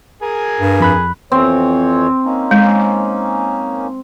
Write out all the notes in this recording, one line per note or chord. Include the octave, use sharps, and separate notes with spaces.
G#4 A#4 G#5
G2
F2 B5 F#6
F2 E3 C4 C#5
A#3 C#4 D#4
G#3